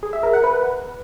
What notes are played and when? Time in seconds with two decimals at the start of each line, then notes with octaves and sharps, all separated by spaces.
0.03 G#4
0.13 E5
0.23 A#4
0.33 F#5
0.44 B4